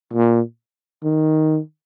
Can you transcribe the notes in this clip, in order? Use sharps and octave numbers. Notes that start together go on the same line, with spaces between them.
A#2
D#3